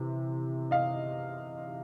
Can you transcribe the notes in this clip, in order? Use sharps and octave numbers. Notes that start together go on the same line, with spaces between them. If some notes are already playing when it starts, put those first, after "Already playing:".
Already playing: C3 E3
D#5 F5